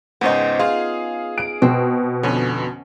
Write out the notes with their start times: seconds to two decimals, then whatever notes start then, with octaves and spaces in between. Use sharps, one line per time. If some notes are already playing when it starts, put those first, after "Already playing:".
0.21 C#2 G#2 B3 C#4 D#4 C5
0.59 F4 G#4 F5
1.38 D7
1.62 B2 C4
2.23 F2 D3 C#4